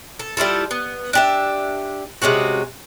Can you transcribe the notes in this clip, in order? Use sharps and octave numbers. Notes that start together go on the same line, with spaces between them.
A4
G3 E4 F4 A4
B3
D4 G4 E5
C3 G#3 C#4 F#4